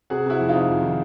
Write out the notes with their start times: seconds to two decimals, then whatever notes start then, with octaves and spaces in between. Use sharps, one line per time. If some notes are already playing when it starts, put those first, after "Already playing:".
0.10 C3 F#4 G#4
0.26 C3 E4 F#4
0.40 F2
0.49 D#4 F4
0.55 C3
0.69 F2
0.83 D#3